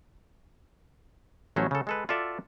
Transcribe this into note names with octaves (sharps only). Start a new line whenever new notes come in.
A1 F#3 A3 C#4 C5
C#3 A4
G#3 A4 B4
F4 F#4 A4 D5 E5